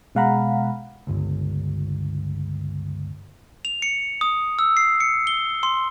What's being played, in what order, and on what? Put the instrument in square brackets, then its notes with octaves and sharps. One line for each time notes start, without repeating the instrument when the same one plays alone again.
[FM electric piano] B2 G#3 F5 F#5 A#5 B5
[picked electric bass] G1 C#2
[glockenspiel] F7
C#7
D#6
E6
C7
C#7
G7
C6